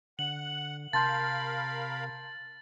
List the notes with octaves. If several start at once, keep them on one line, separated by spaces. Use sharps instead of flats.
D3 F#5 F#7
C3 A#4 F5 A5 B5 C6 G6 A6